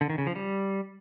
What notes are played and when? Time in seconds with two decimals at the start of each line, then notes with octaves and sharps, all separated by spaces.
0.01 D3
0.10 D#3
0.18 C#3
0.27 F3
0.35 G3